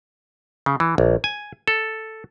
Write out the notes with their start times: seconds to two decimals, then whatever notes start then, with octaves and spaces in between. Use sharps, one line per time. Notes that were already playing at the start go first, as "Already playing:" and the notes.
0.66 C#3
0.80 E3
0.98 A#1
1.24 G#5
1.68 A4